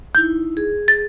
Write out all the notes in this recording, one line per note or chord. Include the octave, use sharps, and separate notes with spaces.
D#4 E4 G6
G#4
A6